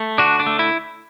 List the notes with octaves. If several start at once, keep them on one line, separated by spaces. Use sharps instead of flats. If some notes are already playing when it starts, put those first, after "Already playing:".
Already playing: A3
D3 D4 F#4
D4
A3
E4